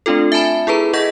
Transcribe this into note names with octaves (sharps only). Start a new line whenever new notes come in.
A3 C4 D4 F4 A4
E5 G#5 A5 B5
E4 G#4 A4 B4 A#5
G#4 D#5 F#5 G6 A#6 B6